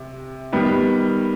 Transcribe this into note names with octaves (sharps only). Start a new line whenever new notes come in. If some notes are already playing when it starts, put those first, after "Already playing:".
Already playing: C3
D#3 G3 B3